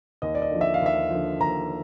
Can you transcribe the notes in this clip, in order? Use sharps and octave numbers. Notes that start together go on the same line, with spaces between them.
D#2 D#5
D5
D#5
D3 F3
E5
F5
D#2 E5
D3 F3
D#2 A#5